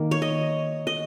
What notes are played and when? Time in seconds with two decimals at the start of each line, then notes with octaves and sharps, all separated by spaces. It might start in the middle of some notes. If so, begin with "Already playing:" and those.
Already playing: D#3 A#3
0.11 C#5
0.22 D#5
0.87 D#5